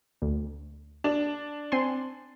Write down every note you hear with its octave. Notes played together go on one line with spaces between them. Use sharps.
D2
D4
C4 G#5 C6